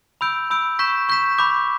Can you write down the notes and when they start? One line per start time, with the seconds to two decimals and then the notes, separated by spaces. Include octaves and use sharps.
0.21 B5 E6 G6 D7
0.50 B5 E6 G6 D7
0.79 C#6 G6 B6 E7
1.09 C#6 G6 B6 E7
1.38 B5 D6 G6